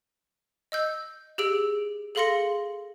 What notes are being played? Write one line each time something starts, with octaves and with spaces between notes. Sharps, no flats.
D#5 E6 G6
G4 G#4 E6 D7
G#4 A4 F5 C6 A#6 C#7